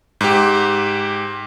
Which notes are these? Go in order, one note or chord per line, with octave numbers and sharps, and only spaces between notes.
G#2 G4